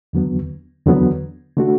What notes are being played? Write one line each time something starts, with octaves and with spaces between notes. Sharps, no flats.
E2 D3 F#3 B3
E2 D3 F#3 B3
D3 A3 D4 F#4